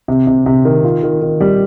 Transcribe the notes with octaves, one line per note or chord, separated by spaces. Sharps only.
C3
C3
C3
D#3
F4
D#3
D#3
G3